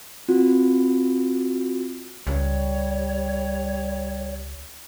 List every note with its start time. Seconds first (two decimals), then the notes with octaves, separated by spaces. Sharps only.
0.28 C4 F4 F#4
2.27 C#2 G3 C#5